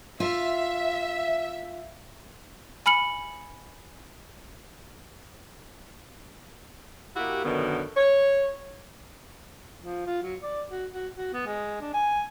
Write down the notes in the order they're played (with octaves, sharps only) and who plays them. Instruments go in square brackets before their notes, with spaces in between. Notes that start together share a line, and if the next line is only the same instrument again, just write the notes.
[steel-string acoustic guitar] F4 [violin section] E5
[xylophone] G#5 B5 F6 C#7 F#7
[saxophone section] A#3 E4 F#4 G4
F#2 B2 D3 D#3 B3
C#5
[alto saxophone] F3
F4
F#3
D5
F#4
F#4
F#4
B3
G#3
D4
G#5